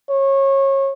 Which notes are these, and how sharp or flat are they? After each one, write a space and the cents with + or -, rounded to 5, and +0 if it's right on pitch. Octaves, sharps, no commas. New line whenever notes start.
C#5 -25